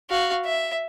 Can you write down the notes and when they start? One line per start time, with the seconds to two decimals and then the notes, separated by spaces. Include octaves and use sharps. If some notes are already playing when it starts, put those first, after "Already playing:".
0.10 F#4 F5
0.45 E5